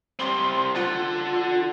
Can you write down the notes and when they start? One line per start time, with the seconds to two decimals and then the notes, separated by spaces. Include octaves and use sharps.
0.19 G3 C4 C6
0.75 F4 A4 F#5